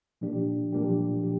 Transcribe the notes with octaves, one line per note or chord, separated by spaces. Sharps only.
A#2 F3 A#3 D4 G4
A#2 F3 A#3 D4 G4
G4